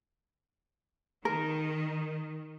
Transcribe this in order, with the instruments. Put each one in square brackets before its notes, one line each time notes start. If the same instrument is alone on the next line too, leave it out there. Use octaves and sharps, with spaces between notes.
[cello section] D#3 [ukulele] A#4